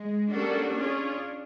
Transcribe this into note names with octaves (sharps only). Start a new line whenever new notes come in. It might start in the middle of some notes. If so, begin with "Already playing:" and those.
Already playing: G#3
G3 A#3 C#4 D4 F#4 A4
C#4 F4 G#4 C#5